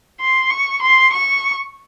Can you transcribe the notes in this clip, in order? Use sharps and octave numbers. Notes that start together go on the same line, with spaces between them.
C6
C#6
C6
C#6